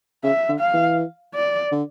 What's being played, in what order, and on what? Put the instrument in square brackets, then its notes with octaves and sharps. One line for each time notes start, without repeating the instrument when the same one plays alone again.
[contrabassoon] C#3 [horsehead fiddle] E5
[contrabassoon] D3
[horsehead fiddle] F5
[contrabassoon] E3
[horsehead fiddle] D5
[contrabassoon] D3